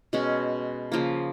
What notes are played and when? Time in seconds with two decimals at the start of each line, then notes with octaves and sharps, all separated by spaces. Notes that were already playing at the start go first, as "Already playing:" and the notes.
0.13 B2 G#3 C#4
0.92 C#3 F3 A#3